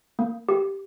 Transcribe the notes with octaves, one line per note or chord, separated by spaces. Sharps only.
A#3
G4